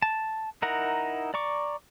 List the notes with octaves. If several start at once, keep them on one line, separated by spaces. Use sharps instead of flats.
A5
D#4 E4 A#4 F#5 A#5
D5 A#5 C#6 D6